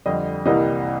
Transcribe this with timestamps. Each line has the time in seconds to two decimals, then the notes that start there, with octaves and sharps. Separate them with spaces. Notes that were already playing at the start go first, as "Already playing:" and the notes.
0.06 F2 D3 G3 D#5
0.45 C2 C3 E3 G3 A#3 D#5